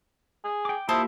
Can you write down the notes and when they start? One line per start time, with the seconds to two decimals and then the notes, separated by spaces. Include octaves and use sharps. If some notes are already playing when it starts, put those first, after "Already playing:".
0.44 G#4
0.65 G5 D6
0.89 A#3 E4 F4 G4 C5 A5 D#6